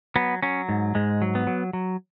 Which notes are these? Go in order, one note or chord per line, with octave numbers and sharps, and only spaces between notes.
F#3 B3
F#3 C#4
G#2
G#2 G#3
F#3
B3
F#3
F#3